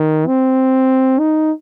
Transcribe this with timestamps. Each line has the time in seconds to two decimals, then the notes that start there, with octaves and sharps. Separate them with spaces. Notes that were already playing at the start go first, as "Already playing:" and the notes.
Already playing: D#3
0.27 C4
1.19 D#4